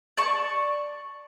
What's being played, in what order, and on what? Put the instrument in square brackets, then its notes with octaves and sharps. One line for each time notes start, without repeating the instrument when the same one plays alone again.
[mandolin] D5 A5 C#6